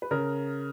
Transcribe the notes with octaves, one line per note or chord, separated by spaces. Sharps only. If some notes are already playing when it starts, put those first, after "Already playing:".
B4
C#3 A#4